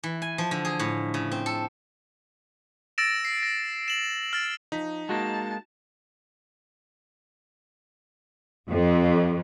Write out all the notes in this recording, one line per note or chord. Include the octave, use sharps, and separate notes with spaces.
E3
G#5
F3
D3
G#4
A2
C#3
C4
A4
E6 A6 A#6 D7 E7
C7
A#6
E7 F#7
F6 A6
F3 D#4 B6
G#3 A#3 F#4 A5
F2